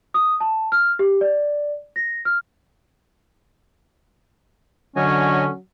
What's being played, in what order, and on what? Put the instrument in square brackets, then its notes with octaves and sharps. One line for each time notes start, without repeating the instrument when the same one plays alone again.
[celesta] D#6
A5
F6
G4
D5
A#6
F6
[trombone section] D3 [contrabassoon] F#3 [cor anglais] C#4 [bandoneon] C#5 D#5 G#5